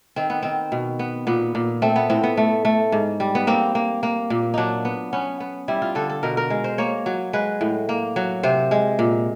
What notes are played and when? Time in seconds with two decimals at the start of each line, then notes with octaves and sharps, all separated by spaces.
0.16 D#3 C4
0.30 B3
0.43 D#3 C4
0.72 B2
0.99 B3
1.27 A#2 B3
1.55 A#2
1.82 A3 C4
1.96 B3
2.10 A2 C4
2.23 B3
2.37 A3
2.65 A3
2.92 G#2
3.20 G3
3.35 B3
3.47 A#3 C4
3.75 A#3
4.03 A#3
4.30 A#2
4.54 F#3 D4 D#4
4.85 B3
5.13 B3 C#4
5.40 B3
5.68 G3 E4
5.82 F4
5.95 D3 A4
6.10 A4
6.23 B2 A#4
6.37 A#4
6.50 G#3
6.64 C5
6.78 A#3 C#5
7.06 F#3
7.33 G#3 B4
7.61 A2
7.89 A#3
8.16 F#3
8.43 C3 C5
8.71 G#3
8.99 A#2